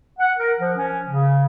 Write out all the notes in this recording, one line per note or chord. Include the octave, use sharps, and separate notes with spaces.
F#5
A#4
F3
C#4
C#3